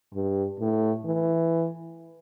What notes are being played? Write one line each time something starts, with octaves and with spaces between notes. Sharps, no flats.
G2
A2
E3